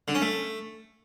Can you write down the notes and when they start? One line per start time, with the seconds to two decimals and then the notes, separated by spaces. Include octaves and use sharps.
0.08 D3
0.15 C#4
0.22 A3